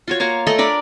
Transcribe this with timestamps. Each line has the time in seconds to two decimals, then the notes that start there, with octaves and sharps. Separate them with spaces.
0.08 F4 F#4 C#5
0.20 A#3 C#5 F5 A#5
0.47 A3 A4 D#5
0.58 D4 A#4 D5 B5